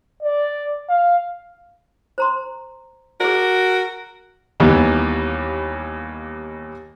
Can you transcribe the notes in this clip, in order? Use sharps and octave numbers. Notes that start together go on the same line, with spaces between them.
D5
F5
C5 A#5 C6
F#4 G#4 A#4 D5
D#2 E3 G3 A#3 B3 D#4